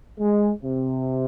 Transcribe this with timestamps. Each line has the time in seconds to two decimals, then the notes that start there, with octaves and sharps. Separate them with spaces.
0.19 G#3
0.63 C3